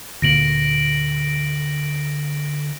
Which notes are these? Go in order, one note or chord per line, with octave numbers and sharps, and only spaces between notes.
D2 A#2 D3 A#3 A#6 D7 F#7